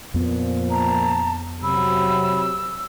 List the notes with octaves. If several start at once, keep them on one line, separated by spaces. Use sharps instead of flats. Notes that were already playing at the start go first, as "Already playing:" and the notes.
F2 A#2 F3 B3
A5 A#5
C3 F#3 B5 E6